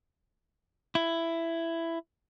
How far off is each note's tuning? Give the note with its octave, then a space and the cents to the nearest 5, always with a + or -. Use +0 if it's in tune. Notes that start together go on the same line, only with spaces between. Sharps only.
E4 +10